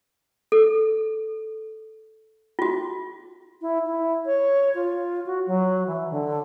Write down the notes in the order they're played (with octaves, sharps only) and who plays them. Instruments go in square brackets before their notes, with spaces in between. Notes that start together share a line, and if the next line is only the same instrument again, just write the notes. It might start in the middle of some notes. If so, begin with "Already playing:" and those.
[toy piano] A4
F4 F#4
[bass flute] E4
E4
C#5
F4
F#4
F#3
E3
D3